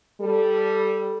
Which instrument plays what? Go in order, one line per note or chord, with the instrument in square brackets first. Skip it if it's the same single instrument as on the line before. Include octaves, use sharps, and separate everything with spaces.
[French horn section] G3 A4